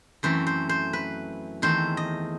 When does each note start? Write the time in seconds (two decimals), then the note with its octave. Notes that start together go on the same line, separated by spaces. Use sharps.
0.23 F#2 E3 A3 C4 C5
0.47 C5
0.69 C5
0.93 B4
1.62 E2 D#3 A3 C4 C5
1.97 D#5